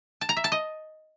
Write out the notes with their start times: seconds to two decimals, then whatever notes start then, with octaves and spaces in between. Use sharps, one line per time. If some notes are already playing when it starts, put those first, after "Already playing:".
0.21 A5
0.29 A#5
0.37 E5
0.44 A5
0.52 D#5